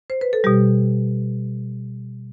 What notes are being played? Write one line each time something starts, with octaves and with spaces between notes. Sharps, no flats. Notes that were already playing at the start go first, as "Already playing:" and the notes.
C5
B4
A4
B2 G3 G4